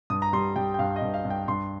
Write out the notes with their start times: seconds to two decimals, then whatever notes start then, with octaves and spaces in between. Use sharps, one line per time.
0.10 G2 D#6
0.22 A#5
0.33 G3 C6
0.56 G3 G5
0.74 G5
0.79 G2 F5
0.96 D#5
1.02 G2
1.14 F5
1.25 G2
1.30 G5
1.48 G2 C6